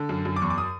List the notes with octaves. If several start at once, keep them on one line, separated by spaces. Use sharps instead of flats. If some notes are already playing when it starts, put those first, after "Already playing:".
Already playing: D3
F#2
F#2
D6
E2 C#6
D6
D#6